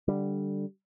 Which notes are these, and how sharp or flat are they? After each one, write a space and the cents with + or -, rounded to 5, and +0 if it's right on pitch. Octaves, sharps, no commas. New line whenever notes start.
D3 +0 G3 +0